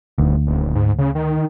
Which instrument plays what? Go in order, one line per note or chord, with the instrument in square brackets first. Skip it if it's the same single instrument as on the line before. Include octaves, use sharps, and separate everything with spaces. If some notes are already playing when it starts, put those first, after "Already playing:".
[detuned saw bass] D#1 [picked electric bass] D2
[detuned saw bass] D#1
G#2
C#3
D#3